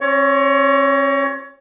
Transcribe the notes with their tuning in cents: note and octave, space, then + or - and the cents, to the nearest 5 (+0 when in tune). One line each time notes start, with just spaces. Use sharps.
C#4 -45 C#5 +20